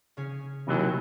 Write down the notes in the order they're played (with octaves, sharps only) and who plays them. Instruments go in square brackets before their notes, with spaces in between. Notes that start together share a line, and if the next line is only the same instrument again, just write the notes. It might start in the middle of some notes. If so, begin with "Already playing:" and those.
[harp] C#3 C#4 G#4
[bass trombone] D#2 [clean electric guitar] C3 E3 F#3